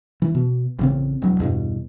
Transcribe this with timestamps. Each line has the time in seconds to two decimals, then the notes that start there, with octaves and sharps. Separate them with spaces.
0.22 E3
0.35 B2
0.79 A1 C#3 C4
1.22 E1 F#3
1.40 E2 G2 B2